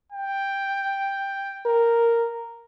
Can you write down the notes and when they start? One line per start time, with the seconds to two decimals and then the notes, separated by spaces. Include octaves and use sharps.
0.12 G5
1.66 A#4